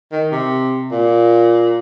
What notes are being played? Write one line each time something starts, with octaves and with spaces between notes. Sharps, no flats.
D#3
C3
A#2